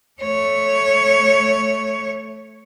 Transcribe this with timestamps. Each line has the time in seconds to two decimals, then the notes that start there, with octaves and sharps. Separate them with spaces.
0.22 A3 C#5